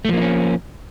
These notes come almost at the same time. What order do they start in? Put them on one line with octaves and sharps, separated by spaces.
A3 F3 A#3 D#4 C#4